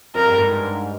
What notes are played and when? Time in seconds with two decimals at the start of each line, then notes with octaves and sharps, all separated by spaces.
0.15 F2 A#4
0.26 G2
0.38 G#2